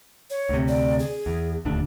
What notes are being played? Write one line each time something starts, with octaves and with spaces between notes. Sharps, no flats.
C#5
D2 C3
D5
G#4
E2
D#1 D2 D4